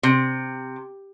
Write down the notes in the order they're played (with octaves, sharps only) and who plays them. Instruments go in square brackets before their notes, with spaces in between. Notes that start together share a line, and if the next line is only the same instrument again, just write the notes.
[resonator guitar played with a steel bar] C3